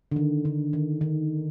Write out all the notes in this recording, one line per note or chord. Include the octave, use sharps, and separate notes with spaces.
D3
D#3
D3
D#3
D#3